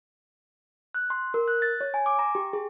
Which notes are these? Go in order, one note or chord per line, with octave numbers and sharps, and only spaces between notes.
F#6
C6
A#4
F#6
A6
C#5
G#5
D6
A#5
G4
G#4